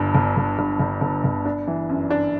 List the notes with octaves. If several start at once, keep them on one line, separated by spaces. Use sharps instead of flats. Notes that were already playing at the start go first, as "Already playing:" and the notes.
Already playing: G1 G2
G1
G1
G2
G1
G1
G1
D4
E3
F#2
D4